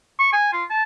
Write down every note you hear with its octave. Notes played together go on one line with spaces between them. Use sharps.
C#6
G#5
F4
A5